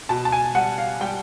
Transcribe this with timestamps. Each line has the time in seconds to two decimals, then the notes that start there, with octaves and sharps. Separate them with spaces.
0.09 B2 A5
0.25 A5
0.32 G#5
0.55 G3 F#5
0.78 F5
1.01 G3 G5